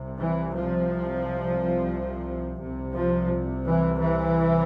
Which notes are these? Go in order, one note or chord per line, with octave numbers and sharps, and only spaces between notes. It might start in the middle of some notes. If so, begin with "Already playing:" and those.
Already playing: C2 C3
E3
F3
C2 C3
F3
E3
E3